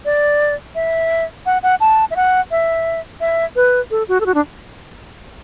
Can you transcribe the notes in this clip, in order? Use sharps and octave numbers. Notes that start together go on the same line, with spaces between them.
D5
E5
F#5
F#5
A5
E5
F#5
E5
E5
B4
A4
F#4
A4
F#4
D4